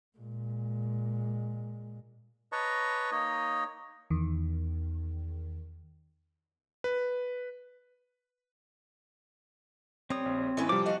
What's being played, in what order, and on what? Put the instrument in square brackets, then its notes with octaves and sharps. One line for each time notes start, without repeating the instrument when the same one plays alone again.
[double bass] A#2 G#3
[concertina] B4 C#5 D#5 A5 A#5 C#6
A#3 D#4 C#5 D#5
[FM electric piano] E2 D#3
[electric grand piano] B4
[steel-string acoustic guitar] G3 [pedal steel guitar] C4 C#5 D#6
[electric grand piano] A#1
[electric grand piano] A1 [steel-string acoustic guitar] E3 C#4 B4
[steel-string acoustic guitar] C3 [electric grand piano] F3 G3 [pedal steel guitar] D6
[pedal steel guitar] F#4 [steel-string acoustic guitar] D#5 F5